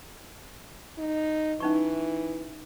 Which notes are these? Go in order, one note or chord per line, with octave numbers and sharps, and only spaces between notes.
D#4
E3 C#4 D#4 C#6